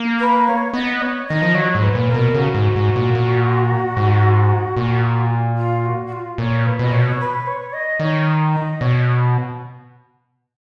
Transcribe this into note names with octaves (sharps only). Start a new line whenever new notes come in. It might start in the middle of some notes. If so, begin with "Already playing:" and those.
Already playing: A#3
B4
C#5
B3 D#5
C#5
D#3 D#5
F3
F#3 C#5
G#2
B4
A#2
A#4
B2
C#3 F#4
G#2
G#2
A#2
A#2
G#2
A#2
F4
F#4
F#4
F4
A#2 C#5
B4
B2
A#2 D#5
B2 C#5
B4
C#5
D#5
D#3 C#5
D#5
B2 C#5